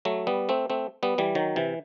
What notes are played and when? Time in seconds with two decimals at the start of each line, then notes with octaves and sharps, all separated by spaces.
0.05 F#3 A3
0.27 G3 B3
0.49 A3 C4
0.70 A3 C4
1.03 G3 B3
1.18 E3 G3
1.35 D#3 F#3
1.56 C3 E3